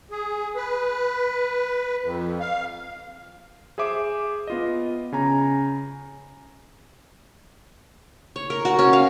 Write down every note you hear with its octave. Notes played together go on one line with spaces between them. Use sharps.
G#4
B4
F2
F5
G#4 C5 E5 D6
B3 F4 D#5
C#3 G#5 A#5
C#5
A#4
F#4
C#4
F5